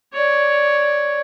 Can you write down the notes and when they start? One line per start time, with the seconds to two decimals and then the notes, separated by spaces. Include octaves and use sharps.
0.13 C#5 D5